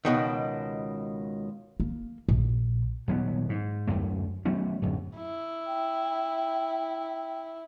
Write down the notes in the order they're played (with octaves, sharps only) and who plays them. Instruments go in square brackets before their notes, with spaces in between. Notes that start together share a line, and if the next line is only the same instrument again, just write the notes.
[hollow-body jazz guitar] C#2 B2 D#3
[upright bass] A#3
A#1
[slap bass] D#1 F#3 B3
G#2
D1 G1 F#2 A3
F#3 A3 B3 C#4
D1 F#2
[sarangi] E4
[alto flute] G5